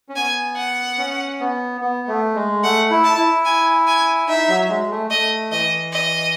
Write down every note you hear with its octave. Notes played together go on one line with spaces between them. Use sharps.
C#4
B3 G#5
F#5
C#4
B3
B3
A3
G#3
A3 F#5
E4
A5
E4
G#5
G#5
D#4 E5
F#3
G#3
A3
A3 D#5
E3 D#5
D#5